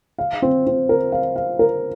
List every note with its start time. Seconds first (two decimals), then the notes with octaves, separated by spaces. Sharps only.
0.19 F5
0.42 C4
0.67 C4
0.89 A#4
1.12 F5
1.36 F5
1.59 A#4